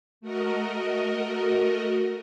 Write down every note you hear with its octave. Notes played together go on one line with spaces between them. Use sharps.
A3 F#4 A#4 D#5